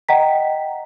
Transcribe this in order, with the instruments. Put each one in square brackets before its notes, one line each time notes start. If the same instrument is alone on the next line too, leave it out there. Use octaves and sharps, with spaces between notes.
[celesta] D#5 F#5 G5 A#5 B6